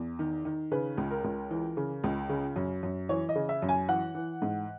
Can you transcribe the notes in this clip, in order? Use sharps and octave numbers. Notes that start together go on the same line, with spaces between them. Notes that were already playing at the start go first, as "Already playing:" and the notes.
Already playing: E2
D#3
D#3
C#3 B4
C#2
A#4
C#2
E3
C#3
C#2
C#3
F#2
F#2
E3 C#5
D#5
C#3
E5
F#2
G#5
E3 F#5
E3
G#2